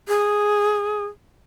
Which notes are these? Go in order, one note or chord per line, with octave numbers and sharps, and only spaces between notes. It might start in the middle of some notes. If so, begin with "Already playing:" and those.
G#4